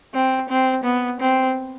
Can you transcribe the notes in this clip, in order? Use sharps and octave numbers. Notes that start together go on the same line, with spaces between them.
C4
C4
B3
C4